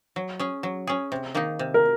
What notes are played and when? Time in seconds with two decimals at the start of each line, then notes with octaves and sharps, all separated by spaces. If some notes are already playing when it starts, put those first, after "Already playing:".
0.16 F#3
0.39 C#4 G#4
0.63 F#3
0.87 C#4 G#4
1.12 C3
1.35 D#3 A#3 D#4
1.59 C3
1.74 A#4